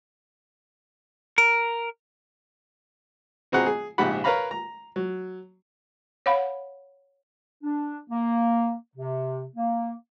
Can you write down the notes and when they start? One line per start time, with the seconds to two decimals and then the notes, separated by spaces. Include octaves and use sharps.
1.38 A#4
3.52 B2 C4 G#4 F#5 A#5
3.66 G#4
3.98 A#1 G#2 C#3 G4 F#5 B5
4.24 A#4 B4 C#5 F5 A#5 B5
4.51 A#5
4.96 F#3
6.26 C#5 F5 F#5 B5
7.63 D4
8.10 A#3
8.96 C3
9.56 A#3